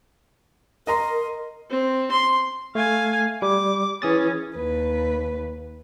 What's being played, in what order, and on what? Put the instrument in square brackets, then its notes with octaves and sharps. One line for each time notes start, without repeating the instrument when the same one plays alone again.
[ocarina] A#4 [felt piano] D#5 A#5 C6
[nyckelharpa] C4
C6
[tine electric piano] A3 [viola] F5 G#5
[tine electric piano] G3 [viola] D6
[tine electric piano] E3 D#6 A6 [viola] C#4 G#4
[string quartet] D#2 B4